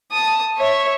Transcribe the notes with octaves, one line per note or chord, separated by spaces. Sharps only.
A5 D#6
C#5 E5